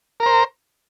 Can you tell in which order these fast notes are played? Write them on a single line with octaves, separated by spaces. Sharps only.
A#4 A#5 C5